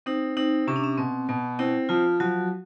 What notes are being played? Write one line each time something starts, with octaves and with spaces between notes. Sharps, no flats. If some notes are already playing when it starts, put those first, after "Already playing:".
C4 D#4
C4 D#4
C3 C#4
D4
C#4
B2 C4
B2 B3
C4 E4
F3 F4
F3 F#3 F#4